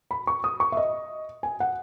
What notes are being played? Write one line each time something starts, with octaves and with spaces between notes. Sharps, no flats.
B5
C#6
D#6
C#6
E5
D#5
G#5
F#5